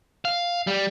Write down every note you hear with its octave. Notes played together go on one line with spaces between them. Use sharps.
F5
G3